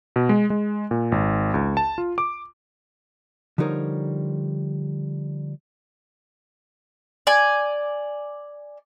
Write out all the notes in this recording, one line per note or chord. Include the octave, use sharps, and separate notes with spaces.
B2
G#3
G#3
A#2
G#1
C#2
A5
F4
D6
D3 F3 G3 D#4 A#4 C#5
D5 G#5